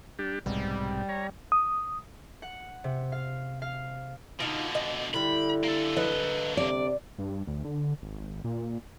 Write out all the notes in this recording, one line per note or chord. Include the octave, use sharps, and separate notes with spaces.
G3 D4 G4
B1 G#2 C3 G3
C#5 A#5
D#6
F#5
C3
F5
F5
B2 D3 D#4 F4
D#5
D3 G3 E4 B5
A#3 A4
B4 D#5
C3 D5
G2
D2
D3
G#1
A#2